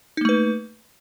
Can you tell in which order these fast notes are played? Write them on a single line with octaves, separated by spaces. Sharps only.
D#4 A#3 A3 B4